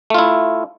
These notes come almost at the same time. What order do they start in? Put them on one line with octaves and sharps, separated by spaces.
A3 F4 E4